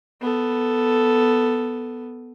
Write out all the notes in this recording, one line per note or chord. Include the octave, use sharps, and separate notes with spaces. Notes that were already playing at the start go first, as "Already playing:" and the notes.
B3 A4